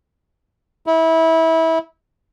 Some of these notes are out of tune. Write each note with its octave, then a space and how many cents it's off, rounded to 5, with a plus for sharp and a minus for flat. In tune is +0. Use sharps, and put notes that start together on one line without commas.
E4 -25